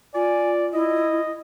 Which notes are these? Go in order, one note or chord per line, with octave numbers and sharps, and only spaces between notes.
F4 D5 G#5
E4 D#5